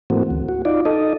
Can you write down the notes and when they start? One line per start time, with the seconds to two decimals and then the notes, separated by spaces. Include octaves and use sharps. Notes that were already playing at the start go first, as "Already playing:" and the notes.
0.10 G#2 E3 A3 A#3 C4 F#4
0.30 D2
0.49 F#4
0.65 D#4 F4 D5
0.85 D#4 A4 D#5